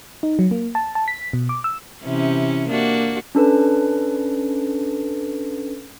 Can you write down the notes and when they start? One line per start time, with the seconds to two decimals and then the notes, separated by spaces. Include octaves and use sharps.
0.23 D#4
0.39 F#3
0.51 A#3
0.75 A5
0.95 A5
1.08 B6
1.33 B2
1.49 D6
1.64 E6
2.03 C3 E3 C#4
2.68 A#3 D4 F#4
3.35 C#4 D4 A4 B4